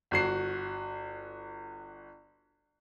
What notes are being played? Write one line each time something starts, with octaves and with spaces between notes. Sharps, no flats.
G1 F#4 C7